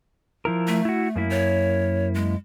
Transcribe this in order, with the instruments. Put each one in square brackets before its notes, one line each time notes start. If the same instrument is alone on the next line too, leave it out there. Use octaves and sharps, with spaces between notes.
[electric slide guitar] F3 E4 A#4
[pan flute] A3
[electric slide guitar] E4 F#4
F#2 A#3 E4
[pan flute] C#5
G#3